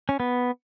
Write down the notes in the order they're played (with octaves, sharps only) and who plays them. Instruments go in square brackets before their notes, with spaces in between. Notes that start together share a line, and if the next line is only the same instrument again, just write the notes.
[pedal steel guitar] C#4
B3